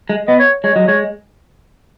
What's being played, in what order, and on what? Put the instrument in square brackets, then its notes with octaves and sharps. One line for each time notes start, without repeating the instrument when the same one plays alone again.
[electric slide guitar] G#3
[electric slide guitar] B3 [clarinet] D#5
[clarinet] C#5
[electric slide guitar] G#3 [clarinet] C#5
[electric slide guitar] F#3 [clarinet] D#5
[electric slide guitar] G#3 [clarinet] C#5